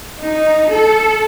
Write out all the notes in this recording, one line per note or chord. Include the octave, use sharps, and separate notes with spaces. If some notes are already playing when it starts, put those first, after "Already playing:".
D#4
A4